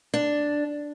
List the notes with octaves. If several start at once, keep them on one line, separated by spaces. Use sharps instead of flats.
D4